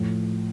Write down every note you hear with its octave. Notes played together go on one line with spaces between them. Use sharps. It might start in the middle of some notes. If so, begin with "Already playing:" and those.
Already playing: A2 F3